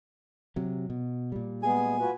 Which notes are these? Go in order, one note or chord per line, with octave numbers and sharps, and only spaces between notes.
C3 F#3
B2
A#2 G3
G#3 B3 G#4 G#5
F4 F#4 B4